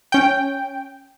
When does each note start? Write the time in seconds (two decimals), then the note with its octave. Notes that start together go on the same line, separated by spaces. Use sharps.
0.12 C#4 G5